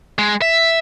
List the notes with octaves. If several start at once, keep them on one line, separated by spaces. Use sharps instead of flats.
G#3
E5